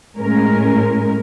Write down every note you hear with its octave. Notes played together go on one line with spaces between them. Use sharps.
A2 G#3 C#4 A#4